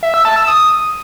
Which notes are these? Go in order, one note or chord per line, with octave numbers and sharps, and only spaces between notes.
E5
E6
A5
E6
D#6